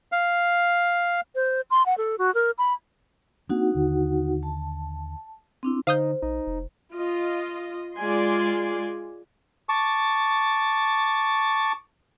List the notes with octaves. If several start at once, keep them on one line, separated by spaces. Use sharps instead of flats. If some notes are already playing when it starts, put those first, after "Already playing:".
F5
C5
C6
F#5
A4
F#4
A#4
B5
A#3 C4 D4 D#4 F#4 F#5
D#2 D3
A5
C4 D4 E4
D3 D#4 C5 F5 D#6 G6
A#1 D#4
F1
F4 D#5
G#3 F4 D5 G#5 C6
A5 C#6 D6